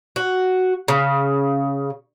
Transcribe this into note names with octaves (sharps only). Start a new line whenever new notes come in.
F#4
C#3